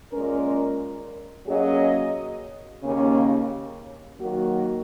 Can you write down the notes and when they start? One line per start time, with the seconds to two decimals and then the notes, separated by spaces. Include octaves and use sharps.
0.12 A#2 G#3 C#4 A#4
1.47 F#3 A#3 C#4 G#4 D#5
2.82 D#2 C#3 A#3 C#4
4.18 D#3 F#3 A#3 F#4 A#4